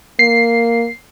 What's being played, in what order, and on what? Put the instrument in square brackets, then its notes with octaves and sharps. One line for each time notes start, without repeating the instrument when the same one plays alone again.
[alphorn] A#3 [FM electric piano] C7